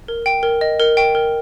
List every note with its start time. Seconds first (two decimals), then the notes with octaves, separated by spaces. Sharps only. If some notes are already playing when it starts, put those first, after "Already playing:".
0.08 A#4
0.26 G5
0.43 A#4
0.61 D#5
0.80 A#4
0.97 G5
1.15 A#4